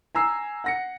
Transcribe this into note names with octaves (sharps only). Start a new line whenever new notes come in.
G#5 A#5 E6 C7
F#5 A#6 C#7